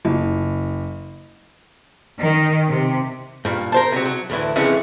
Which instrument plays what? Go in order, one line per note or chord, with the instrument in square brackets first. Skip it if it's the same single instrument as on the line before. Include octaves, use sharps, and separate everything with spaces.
[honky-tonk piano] F#1
[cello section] D#3
C3
[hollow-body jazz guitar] G2 A#2
A#4 C5 A5
C3 F#3
F#3
D2 A2 E3
F2 C#3 E3 G#3 A3 C#4